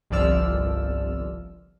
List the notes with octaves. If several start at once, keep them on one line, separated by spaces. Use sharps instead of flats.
G1 C2 F3 D5 E6 F6